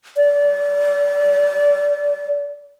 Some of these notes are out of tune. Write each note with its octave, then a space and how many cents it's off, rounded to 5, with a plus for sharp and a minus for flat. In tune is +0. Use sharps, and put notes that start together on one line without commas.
D5 -30